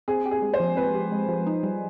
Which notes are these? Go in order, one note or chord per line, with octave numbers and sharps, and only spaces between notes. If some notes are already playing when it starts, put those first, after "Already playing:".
C4 G#4
G4
G#4
G#3
C5
F3
C4 B4
G4
G#3
F3
D#4
G3